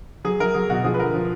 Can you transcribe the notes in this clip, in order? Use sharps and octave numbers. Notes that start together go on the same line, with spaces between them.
F#3 G#4
F#3 A#4
F#3 G#4
B2 F#4
F3 G#4
B4
D3 A#4
F3